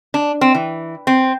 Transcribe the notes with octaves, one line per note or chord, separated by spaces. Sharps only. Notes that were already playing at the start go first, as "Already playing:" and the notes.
D4
C4
E3
C4